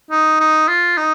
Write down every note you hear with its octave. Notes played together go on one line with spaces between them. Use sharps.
D#4
D#4
F4
D#4